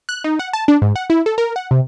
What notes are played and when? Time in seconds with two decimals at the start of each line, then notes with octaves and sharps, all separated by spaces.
0.09 F#6
0.24 D#4
0.39 F#5
0.53 A5
0.68 D4
0.82 G#2
0.96 F#5
1.10 E4
1.26 A4
1.38 A#4
1.56 F#5
1.71 C3